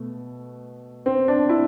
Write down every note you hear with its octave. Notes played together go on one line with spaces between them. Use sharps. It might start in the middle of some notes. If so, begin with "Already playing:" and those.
Already playing: B2 A3
C4
D4
E4